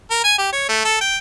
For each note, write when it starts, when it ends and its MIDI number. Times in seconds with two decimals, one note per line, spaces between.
0.11 0.22 70
0.24 0.34 80
0.38 0.49 67
0.52 0.64 73
0.69 0.80 57
0.85 1.00 69
1.01 1.17 79